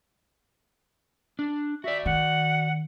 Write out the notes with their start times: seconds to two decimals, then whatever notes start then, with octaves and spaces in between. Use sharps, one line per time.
1.39 D4
1.84 F#4 D5 E5
2.06 D#3 F#5